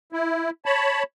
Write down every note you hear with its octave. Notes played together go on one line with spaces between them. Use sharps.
E4
C#5 A5 B5